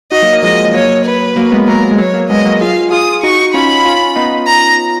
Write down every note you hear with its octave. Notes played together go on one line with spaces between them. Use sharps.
D#4 F#4 D#5
F#3 A#3
F#3 A#3
F3 G#3 D#5
F#3 A#3 C#5
B4
F#3 A#3
G#3 B3
F#3 A#3 A#4
G#3
F#3 C#5
F#3 A#3
G#3 B3 D#5
F#3 A#3
F4 G#4 F5
F4 G#4 D#6
D#4 F#4 C#6
C#4 F4 B5
C#4 F4
B3 D#4
A#5